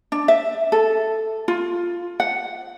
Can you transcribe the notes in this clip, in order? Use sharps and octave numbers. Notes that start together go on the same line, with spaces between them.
D4
E5
A4
F4
F#5